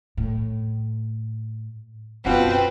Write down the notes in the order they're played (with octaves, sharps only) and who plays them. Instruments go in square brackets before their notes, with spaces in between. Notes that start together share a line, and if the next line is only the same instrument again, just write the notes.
[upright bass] A2
[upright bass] F#2 E4 [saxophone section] B2 F3 F#5 [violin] C4 B4